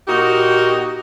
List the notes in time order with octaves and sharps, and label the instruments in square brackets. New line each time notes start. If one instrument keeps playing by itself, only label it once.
[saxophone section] A#2 D#4 F#4 G4